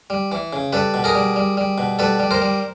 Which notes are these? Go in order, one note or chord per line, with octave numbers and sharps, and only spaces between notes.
G3
E3
C#3
G3 A4 B4
B2
G#4 A#4
G3
G3
G3
B2
G3 A4 B4
G3
A#4 C5
G3